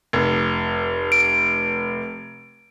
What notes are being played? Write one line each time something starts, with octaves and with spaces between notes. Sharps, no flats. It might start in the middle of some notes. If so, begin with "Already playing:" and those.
F1
D7